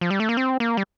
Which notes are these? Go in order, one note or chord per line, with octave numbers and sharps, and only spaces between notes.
F3
G3
A3
A#3
C4
A#3
G3